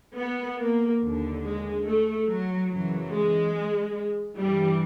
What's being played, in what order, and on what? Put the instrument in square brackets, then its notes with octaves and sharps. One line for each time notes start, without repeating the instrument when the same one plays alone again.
[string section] B3
A#3
D#2 D3
G#3
A3
F#3
F#2 C#3 E3 F#3
G#3
G2 E3 G3